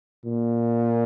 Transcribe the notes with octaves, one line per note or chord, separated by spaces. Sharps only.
A#2